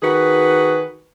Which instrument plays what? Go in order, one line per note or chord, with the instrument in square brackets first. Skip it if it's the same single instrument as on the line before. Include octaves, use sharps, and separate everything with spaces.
[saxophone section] D#3 F#4 G#4 B4